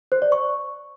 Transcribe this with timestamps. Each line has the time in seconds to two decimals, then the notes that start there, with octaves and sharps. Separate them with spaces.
0.12 C5
0.22 D5
0.32 C#6